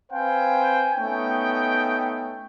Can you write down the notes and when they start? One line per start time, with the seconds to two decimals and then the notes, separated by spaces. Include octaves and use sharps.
0.12 C4 B4 C5 F5 G5 G#5
0.96 A3 B3 C#4 D#4 G5